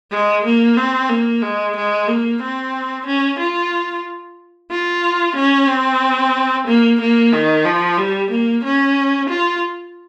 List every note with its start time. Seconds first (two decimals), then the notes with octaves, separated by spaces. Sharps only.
0.11 G#3
0.45 A#3
0.77 C4
1.09 A#3
1.42 G#3
1.76 G#3
2.08 A#3
2.42 C4
3.06 C#4
3.39 F4
4.71 F4
5.36 C#4
5.68 C4
6.67 A#3
7.00 A#3
7.33 D#3
7.65 F3
7.98 G3
8.31 A#3
8.64 C#4
9.29 F4